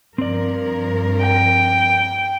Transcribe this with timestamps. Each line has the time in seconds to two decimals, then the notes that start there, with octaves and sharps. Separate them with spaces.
0.18 G2 F3 C4 A#4 D5
1.22 G5